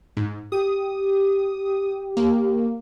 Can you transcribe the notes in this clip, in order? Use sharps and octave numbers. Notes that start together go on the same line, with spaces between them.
G#2
G4 D#6
A#3